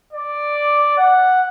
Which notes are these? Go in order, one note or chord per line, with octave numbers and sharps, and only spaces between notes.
D5
F#5